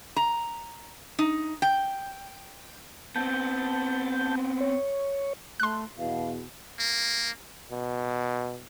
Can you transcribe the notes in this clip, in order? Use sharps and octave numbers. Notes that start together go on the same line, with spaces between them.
A#5
D#4
G5
B3 C4 A5 G6
C#5
A3 C6 F#6
E2 B2 F5
A#3
B2